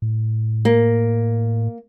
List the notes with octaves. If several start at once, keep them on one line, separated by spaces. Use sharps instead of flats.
A2
A#3